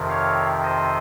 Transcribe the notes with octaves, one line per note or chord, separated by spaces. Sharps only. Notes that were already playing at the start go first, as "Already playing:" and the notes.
Already playing: F2 C3 D#3
C#5 F5
C5 D#5